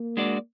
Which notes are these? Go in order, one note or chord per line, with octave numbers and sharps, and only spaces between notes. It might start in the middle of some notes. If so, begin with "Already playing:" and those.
Already playing: A#3
G#3 D4 F#4 D5